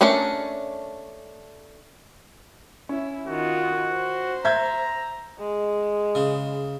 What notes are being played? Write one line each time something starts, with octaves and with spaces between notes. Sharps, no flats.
A3 C#4 D4 A#4 D5
C#4 E4
D#3 F4 F#4
C5
E5 A#5 G6 G#6
G#3
C#3